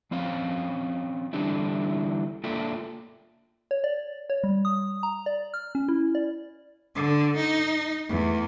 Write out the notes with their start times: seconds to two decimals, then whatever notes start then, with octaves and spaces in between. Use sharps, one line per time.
0.11 F3 C4 C#4 F5
1.33 D3 E3 G3 D4 E4
2.44 A#3 D4 F4 A4 E5 G5
3.71 C#5
3.84 D5
4.30 C#5
4.44 G3
4.65 D#6
5.03 A#5
5.26 D5
5.54 F6
5.75 C#4
5.88 E4
6.15 D5
6.95 D3
7.37 D#4
8.09 E2 A3